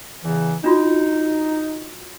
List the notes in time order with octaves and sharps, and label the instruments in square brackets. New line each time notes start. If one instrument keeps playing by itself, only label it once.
[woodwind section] E2 C#3 E3
[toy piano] D4 F4 F#4 [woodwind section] D#4